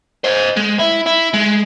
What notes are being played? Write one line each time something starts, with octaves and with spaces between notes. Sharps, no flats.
C5 D#5
G#3
E4
E4
G#3